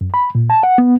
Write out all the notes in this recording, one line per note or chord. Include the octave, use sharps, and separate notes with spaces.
F#2
B5
A#2
A5
F#5
B3